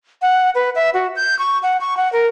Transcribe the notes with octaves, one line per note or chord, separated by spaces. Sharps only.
F#5
B4
E5
F#4
G6
C#6
F#5
C#6
F#5
A#4